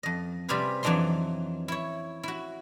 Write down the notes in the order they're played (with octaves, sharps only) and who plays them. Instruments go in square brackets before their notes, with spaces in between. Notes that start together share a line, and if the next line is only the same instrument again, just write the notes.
[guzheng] F2 D#5
C3 G3 F4 G4 G#4 B4
F2 E3 F#3 D4 D#4 C6
E4 C#5
E4 F#4